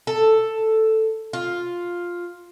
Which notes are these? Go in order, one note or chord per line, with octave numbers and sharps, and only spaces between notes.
A4
F4